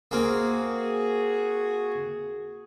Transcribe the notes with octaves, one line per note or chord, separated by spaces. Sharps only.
A#3 C4 F#4 G#4